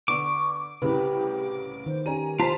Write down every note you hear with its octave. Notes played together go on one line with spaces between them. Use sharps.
D3 B3 C#6 D6
C2 A2 C#3 G4 B4
D#3 C5
C#4 G4 G#5 A#5 D#7
C4 F4 C5 A5 A#5 B6